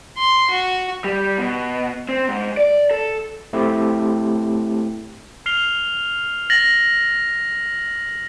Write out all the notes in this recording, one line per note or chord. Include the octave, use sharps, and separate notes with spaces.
C6
F#4
G3
B2
C4
G#2
D5
A4
A3 C4 E4 G4
F6 C7 F7 G7
A6 A#6 F#7